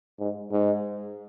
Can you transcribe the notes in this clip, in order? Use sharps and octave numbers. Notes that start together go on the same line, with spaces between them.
G#2
G#2